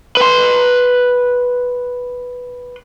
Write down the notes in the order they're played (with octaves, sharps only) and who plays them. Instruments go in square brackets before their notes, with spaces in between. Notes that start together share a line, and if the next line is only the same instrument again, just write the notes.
[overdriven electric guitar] B4 C6